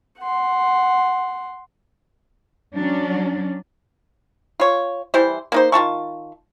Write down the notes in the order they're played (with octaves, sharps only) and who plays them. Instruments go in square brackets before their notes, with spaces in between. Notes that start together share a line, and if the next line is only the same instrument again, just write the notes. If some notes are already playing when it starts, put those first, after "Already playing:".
[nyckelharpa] F#5 C6
[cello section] F#3 C#4 D4
[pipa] F4 C#5
E3 G3 E4 C5
A#3 D#4 C5
D#3 F4 A5 C#6